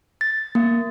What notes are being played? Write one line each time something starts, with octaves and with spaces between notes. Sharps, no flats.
A6
A#3